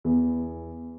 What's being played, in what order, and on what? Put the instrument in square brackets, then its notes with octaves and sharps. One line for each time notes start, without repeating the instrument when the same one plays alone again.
[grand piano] E2